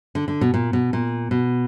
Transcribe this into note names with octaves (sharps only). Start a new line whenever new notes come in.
D3
D3
B2
A#2
B2
A#2
B2